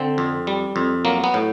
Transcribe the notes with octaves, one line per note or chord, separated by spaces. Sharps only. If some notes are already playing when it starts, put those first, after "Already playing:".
Already playing: D3 C4
F2
G3
F2
F#3 A#3
B3
A2